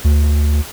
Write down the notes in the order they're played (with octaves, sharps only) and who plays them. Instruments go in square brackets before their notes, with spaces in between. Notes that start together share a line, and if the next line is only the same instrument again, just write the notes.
[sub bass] D2